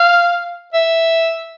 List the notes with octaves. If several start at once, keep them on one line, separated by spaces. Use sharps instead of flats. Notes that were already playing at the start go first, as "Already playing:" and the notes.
Already playing: F5
E5